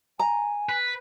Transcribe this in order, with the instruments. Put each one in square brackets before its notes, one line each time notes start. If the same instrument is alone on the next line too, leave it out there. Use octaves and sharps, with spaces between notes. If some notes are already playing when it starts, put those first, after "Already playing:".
[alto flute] G#5 [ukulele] A#5
[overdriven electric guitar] B4